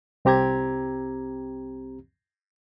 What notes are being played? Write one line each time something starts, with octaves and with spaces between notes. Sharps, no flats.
C2 C4 G4 A#5 G#6